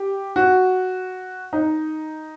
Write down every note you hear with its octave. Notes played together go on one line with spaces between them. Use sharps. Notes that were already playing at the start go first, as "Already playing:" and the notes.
Already playing: G4
F#4
D#4